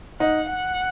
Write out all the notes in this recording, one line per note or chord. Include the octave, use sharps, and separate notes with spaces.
D#4 F#5
F#5